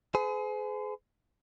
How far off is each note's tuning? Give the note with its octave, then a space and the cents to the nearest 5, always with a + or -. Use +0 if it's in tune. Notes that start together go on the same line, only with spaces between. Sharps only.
G#4 +30 C5 -45